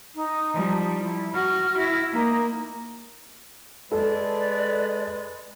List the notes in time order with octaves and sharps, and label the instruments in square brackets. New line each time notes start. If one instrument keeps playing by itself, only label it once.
[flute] D#4
[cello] F3 G3
[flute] E4
[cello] F#4 [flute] F6
[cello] E4 [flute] A#6
[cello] A#3 [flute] D#4
[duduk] G#3 [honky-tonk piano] A4 [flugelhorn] B4 [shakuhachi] D5